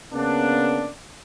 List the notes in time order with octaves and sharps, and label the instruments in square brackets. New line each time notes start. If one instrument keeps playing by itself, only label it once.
[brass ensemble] C#3 A#3 B3 D4